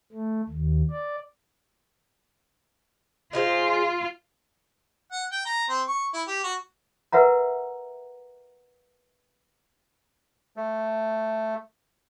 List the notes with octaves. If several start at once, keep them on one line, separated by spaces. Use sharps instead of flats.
A3
D#2
D5
D#4 F4 G#4 C5
F#5
G5
A#5
C4
C#6
E4
G4
F#4
A#4 B4 E5 F#5 A#5
A3